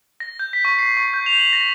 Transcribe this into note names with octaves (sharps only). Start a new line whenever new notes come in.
A#6
G6
B6
C#6
C7
C#6
G6
F7
F#7
A#6